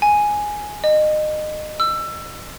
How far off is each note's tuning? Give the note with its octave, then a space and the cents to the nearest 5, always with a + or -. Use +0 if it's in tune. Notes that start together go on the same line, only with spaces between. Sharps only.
G#5 +0
D#5 -25
E6 +20